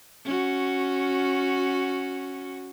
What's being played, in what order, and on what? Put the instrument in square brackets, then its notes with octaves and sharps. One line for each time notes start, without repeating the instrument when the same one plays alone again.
[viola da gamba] C#4 F#4